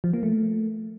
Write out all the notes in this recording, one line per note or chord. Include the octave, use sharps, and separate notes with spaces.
F3
A#3
A3